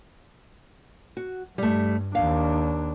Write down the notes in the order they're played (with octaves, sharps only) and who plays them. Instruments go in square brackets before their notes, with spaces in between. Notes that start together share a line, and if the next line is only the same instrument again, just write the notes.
[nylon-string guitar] F#4
[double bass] G2 [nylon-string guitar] G3 A3
[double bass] D#2 D4 [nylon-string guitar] F5